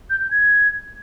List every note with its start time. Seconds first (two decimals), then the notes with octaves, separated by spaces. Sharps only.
0.10 G6
0.20 G6
0.31 G#6